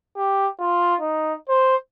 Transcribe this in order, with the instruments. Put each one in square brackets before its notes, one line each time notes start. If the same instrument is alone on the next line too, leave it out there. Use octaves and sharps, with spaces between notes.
[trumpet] G4
F4
D#4
C5